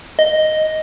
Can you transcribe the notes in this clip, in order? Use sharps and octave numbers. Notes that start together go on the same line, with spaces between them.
D#5